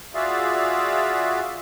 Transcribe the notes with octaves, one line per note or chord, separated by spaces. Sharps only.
F4 F#4 G#4 D5 E5 F5